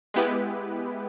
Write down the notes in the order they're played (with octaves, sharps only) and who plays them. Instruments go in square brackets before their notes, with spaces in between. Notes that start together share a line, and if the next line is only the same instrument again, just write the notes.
[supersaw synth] G#3 B3 E4 G4 B4